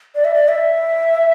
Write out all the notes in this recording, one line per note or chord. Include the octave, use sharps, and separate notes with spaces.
D5
E5
D5
E5